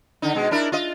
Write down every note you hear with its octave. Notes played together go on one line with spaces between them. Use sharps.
D3 D#4
B2 G#3
D4 E4 A#4
F4 D#5